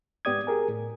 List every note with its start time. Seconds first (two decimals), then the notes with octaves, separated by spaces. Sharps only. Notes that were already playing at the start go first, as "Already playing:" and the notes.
0.25 G#2 B3 G4 D5 D#6 G#6
0.47 G4 G#4 A#4 G#5
0.68 A2